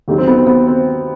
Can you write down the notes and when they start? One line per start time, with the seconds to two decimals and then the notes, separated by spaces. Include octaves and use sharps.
0.08 D#2 D#3 F#3 G4
0.18 C4
0.27 B3
0.38 C4
0.47 B3
0.67 C4